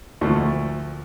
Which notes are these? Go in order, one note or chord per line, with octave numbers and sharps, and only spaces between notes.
D2 A#2 F3 A3 C#6